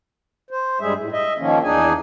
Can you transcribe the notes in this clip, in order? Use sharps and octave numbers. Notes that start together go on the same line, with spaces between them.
C5
G2 G3 G#3 G#4 E5
A2
D#5 E5
D#3 F3 A#3 C#4
E2 D4 D#4 G#4 G#5